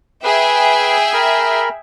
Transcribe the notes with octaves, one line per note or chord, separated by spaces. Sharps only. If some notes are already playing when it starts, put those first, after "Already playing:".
G#4 B4 E5 G5
A#4 B5